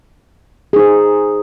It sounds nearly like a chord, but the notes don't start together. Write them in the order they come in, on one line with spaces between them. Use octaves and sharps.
G#4 D#4 C5